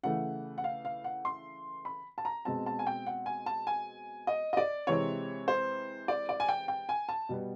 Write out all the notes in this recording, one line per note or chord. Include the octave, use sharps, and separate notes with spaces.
C#3 E3 A3 F#5
F#5
F5
F5
F#5
C6
B5
A5
A#5
B2 G#3 C4 A5
A5
G#5
G5
F#5
G#5
A5
G#5
D#5
D#5
D5
C3 E3 G#3 C4 C#5
C5
D5
D5
G#5
G5
G5
G#5
A5
B2 G3 B3